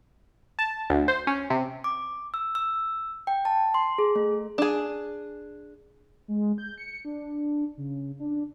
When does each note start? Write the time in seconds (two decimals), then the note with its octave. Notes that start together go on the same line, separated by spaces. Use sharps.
0.59 A5
0.90 D2
1.08 C5
1.27 C#4
1.50 C3
1.84 D6
2.34 E6
2.55 E6
3.27 G5
3.45 A5
3.74 C6
3.98 G#4
4.16 A3
4.58 D4 G#4
6.28 G#3
6.58 G6
6.78 C#7
7.05 D4
7.77 C#3
8.19 D4